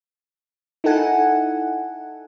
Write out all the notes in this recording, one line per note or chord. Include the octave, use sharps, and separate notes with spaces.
D#4 E4 A4 F#5 G#5